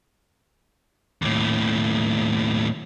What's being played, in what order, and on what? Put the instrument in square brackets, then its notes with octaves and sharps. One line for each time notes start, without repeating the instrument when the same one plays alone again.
[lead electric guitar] D#2 A2